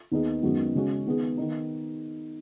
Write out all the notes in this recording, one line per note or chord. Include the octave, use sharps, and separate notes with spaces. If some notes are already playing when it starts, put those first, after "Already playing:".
D#2 D#3 B3 D#4 G#4
F#2 D#3 G#3 B3 F#4
C#3 G#3 C#4 F#4
D#3 B3 G#4
D#3 B3 D#4